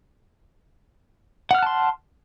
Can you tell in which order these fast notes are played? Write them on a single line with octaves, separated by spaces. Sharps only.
F#5 F6 F#6 A5 C6